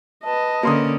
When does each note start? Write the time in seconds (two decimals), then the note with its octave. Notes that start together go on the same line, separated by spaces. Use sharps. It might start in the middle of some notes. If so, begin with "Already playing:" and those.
0.24 B4 D#5 A5
0.63 D3 A#3 C#4 C6 D#6